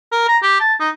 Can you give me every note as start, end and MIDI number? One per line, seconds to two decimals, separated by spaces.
0.11 0.24 70
0.28 0.37 82
0.42 0.57 67
0.60 0.73 81
0.80 0.89 63